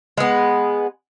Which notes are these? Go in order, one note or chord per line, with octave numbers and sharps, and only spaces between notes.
G#3 B3